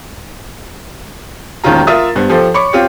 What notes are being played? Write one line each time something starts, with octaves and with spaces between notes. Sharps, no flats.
E1 A#1 D#3 C#4 F4 A#5
F4 A#4 E5 D#6 A6
G2 B3 C5
F3 G4 A4 C5
C#5 B5 C#6 D6 C#7
C4 F4 G4 C#5